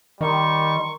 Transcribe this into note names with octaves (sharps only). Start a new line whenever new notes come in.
D#3 G3 A#4 A#5 C6 C#6